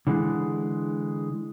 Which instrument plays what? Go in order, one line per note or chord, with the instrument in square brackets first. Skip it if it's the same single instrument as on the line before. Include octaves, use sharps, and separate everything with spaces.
[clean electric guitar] D3 E3 G#3